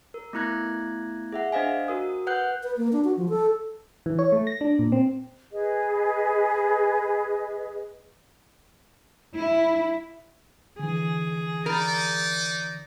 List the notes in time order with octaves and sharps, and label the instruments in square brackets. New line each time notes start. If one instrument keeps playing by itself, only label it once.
[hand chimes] A#4
A3 B3 E4 F#6 G#6 A#6
G#4 E5 F#5
D4 C5 D#5 F5 G#5
F#4 A#4 D#6
B4 F#5 F#6 G6
[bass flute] B4
A#3
D4
F#4
F3
A4
[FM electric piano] E3
C#5
A3
A#6
D4
A#2
C4
[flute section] G#4 B4 D#5
[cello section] E4
[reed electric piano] D3 E3 [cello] G#4
[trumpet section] D#4 D5 [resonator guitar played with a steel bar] A#4